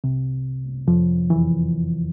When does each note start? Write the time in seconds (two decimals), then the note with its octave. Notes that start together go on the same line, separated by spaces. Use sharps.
0.04 C2 C3
0.88 F2 F3
1.30 E2 E3